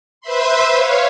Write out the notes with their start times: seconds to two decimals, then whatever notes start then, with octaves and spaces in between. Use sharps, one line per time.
0.21 B4 C5 E5 B5 C6
0.73 C#5 F5